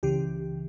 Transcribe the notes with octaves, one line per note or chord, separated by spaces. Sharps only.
C#2 C#3 E3 G4